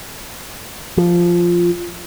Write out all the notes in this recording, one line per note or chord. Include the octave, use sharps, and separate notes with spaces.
F3